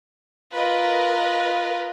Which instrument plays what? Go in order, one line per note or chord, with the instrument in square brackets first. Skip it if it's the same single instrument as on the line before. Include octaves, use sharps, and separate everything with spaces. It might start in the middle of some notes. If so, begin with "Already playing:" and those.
[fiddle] F4 [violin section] A#4 B4 D#5